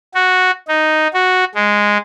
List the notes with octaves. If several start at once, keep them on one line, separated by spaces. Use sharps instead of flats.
F#4
D#4
F#4
G#3